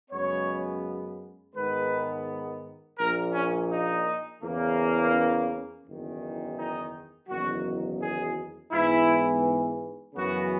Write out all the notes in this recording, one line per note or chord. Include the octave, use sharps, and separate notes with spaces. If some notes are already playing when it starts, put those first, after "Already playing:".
F#2 C#3 G#3 B3 C#5
G#2 D#3 G#3 B3 B4
A#1 A#2 A#3 A#4
C#4
D#4
E2 C#3 E3 A#3
C#4
F#1 E2 D#3
D#4
F#1 E2 D#3 F#3 F#4
G#4
G#2 E3 B3 E4
F#2 C#3 E3 B3 F#4